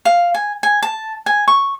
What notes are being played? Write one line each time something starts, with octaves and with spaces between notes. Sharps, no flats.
F5
G#5
G#5
A5
G#5
C#6